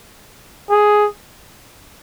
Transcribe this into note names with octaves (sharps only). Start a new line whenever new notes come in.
G#4